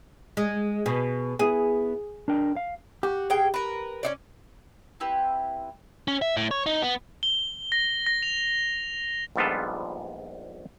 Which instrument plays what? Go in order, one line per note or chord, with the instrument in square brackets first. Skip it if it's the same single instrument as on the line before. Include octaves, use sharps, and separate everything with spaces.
[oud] G#3
[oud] B2 [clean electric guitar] G#4
[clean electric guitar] B3 E4 [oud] G#4
[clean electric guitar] D4 A#4 G5
F5
[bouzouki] F#4 [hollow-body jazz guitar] G4
[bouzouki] B2 G#4 G5
A#4 B4
C#4 D#4 D5
[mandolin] C4 E4 G4 B4
[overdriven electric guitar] C#4
E5
A2
C#5
D#4
B3
[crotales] G7
A#6
A#6
F7
[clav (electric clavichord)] A#1 G#2 G3 B3 F4 A4